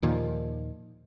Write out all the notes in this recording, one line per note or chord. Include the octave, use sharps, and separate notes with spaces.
D#2 A#2 D#3 F3